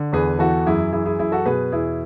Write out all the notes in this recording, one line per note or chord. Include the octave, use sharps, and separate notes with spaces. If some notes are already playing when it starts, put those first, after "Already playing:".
Already playing: D3
E2 G#4 B4
E3 F#4 A4
F#2 E4 G#4
E3 E4 G#4
E4 G#4
F#2 E4 G#4
F#4 A4
B2 G#4 B4
E2 E4 G#4